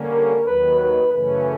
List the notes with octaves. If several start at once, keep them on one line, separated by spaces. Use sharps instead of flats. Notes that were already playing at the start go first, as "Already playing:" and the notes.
Already playing: D3 G3 A#3 C#4
A#4
D#2 D#3 F#3 B4
B4
F#2 C#3 E3 A3 C#4 B4